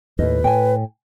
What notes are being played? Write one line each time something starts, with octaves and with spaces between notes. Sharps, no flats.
D#2 A2 B4 D#5
A2 G5 G#5